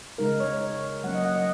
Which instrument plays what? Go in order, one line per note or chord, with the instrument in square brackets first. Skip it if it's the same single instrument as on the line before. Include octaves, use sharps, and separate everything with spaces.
[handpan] C#3 G#3 D#4 A#4
C#5
F#3 A#3 C#4 F#5
D#5
F#5
D#5